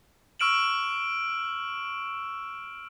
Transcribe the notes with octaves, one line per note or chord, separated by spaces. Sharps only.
C#6 E6 F6 D7 E7 F#7